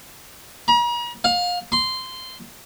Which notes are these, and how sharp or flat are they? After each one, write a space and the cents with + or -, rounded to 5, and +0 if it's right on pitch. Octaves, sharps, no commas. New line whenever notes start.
A#5 +45
F5 +30
C6 -10